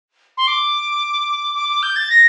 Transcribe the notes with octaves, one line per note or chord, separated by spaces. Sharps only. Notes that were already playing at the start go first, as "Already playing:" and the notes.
C6
D6
D6
D6
G6
A6
A#6